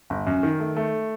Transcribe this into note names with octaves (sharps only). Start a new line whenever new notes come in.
G1
F#2
D#3
A3
A3